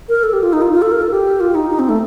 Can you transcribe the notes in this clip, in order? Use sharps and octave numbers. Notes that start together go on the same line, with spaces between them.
A#4
A4
G4
F4
D#4
F4
F4
A4
A#4
A4
G4
F4
D#4
D#4
C4
A3